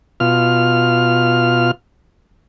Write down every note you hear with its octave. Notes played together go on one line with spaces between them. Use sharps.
B2 F4 F6